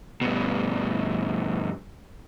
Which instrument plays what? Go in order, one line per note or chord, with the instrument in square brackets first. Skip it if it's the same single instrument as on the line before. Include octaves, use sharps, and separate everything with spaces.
[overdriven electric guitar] G2 B2